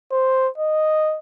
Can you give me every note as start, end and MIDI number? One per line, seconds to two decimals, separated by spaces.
0.11 0.48 72
0.58 1.18 75